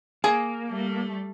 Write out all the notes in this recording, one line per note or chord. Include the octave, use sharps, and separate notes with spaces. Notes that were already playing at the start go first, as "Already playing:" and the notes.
A#3 G#4
G3 A3